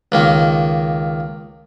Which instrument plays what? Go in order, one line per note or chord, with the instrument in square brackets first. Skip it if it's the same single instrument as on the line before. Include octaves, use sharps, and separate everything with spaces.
[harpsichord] C#2 D#3 A#3